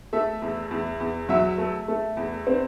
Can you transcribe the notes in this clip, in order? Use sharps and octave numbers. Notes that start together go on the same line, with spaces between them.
A3 E5
E2
E2
E2
F#3 E5
A3
A3
E2
C4